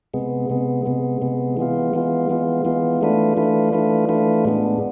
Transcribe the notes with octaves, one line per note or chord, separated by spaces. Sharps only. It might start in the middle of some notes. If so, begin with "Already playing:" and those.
C3 G#3 B3
C3 G#3 B3
C3 G#3 B3
C3 G#3 B3
E3 G#3 B3 F4
E3 G#3 B3 F4
E3 G#3 B3 F4
E3 G#3 B3 F4
E3 A3 D4 F4 B4
E3 A3 D4 F4 B4
E3 A3 D4 F4 B4
E3 A3 D4 F4 B4
A2 G#3 B3 D4